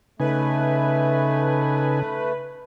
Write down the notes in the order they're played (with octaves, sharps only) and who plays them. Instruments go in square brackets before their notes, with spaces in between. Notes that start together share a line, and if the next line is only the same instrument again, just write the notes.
[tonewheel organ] C#3 [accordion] A3 [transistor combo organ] D#4 G#5 [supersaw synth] B4